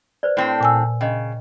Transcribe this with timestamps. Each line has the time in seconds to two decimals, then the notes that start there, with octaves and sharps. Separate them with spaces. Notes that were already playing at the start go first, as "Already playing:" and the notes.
0.23 B4 C5 D5
0.37 A2 C4
0.61 A#2 G#5 E6
1.01 C#3 D#5 G5